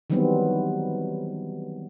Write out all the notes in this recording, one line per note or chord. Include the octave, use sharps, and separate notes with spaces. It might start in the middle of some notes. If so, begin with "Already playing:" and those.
D#3 E3 F#3 G3 B3 C4